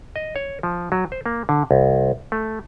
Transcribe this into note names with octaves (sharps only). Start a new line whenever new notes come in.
D#5
C#5
F3
F#3
C5
A#3
D3
C2
A3